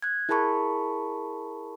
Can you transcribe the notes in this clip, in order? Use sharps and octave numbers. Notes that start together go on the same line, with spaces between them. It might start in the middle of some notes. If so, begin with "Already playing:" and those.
F#6 G#6
E4 G#4 A#4 A5 B5 C#6